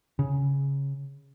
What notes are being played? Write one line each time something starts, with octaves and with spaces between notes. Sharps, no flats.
C#3